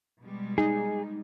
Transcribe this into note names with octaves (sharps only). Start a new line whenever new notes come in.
B2 G3 G#3
D#4 G#4